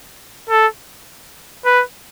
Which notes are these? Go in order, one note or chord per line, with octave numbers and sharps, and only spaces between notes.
A4
B4